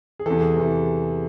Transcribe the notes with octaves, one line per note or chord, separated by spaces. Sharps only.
G#4
E2 C3 E3 A4
G#4
E2 C3 E3